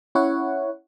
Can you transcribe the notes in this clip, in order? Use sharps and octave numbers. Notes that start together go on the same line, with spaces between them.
C#4 E4 C#5 F#5